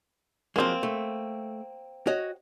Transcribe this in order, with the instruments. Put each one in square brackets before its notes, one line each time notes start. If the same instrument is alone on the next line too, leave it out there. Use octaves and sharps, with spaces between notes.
[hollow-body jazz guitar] F3 F#3 G#3 [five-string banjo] A#3 C4
[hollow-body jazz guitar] A3
F#4 C#5 D#5